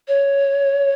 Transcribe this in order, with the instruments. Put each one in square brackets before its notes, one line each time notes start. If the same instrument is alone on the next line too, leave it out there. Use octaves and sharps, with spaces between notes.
[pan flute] C#5